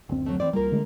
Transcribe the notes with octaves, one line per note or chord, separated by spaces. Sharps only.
F#1 D2 C4
F#3 A3
E3 C4 D5
C2 G3 A#3 F4 A#4
D3 G#3 A3